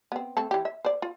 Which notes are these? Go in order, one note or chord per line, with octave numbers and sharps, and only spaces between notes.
B3 C4
A3 C4 A4
E3 G4
E5
C5 D5
F4